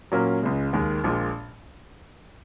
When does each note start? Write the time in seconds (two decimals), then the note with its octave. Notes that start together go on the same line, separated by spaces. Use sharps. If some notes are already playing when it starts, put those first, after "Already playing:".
0.12 A#2 F#3 A#3 C#4
0.42 C#2 C#3 G#3
0.73 D#2 D#3 G#3
1.04 A#1 A#2 G#3